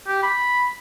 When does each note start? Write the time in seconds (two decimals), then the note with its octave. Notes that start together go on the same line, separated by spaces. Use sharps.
0.07 G4
0.23 B5